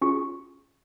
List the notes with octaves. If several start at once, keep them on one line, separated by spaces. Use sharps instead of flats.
C#4 F4 G#4 C#6